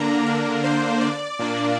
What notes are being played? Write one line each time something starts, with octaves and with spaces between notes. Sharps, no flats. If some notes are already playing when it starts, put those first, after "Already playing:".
Already playing: D3 A#3 D4 A#5
A#4
C5
D5
A#2 A#3 D4